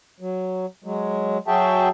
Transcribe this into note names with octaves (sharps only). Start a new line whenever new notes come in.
F#3
F#3 G#3
F#3 F#4 G#4 E5 G5 A5